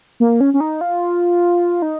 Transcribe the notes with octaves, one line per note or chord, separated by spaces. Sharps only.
A#3
C#4
C#4
D#4
F4
D#4